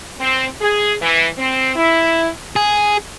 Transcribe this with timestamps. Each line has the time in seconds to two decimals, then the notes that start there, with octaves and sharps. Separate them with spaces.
0.20 C4
0.61 G#4
1.01 E3
1.38 C4
1.76 E4
2.56 G#4